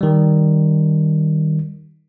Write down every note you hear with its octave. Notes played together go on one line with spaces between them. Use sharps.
D#3 G3